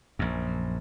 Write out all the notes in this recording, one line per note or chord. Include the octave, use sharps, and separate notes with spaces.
A#1 F#2